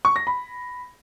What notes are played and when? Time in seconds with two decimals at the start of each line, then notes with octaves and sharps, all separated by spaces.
0.05 C#6
0.16 A#6
0.27 B5